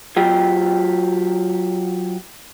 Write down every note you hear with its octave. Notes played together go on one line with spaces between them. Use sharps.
F#3 F4 G4 G5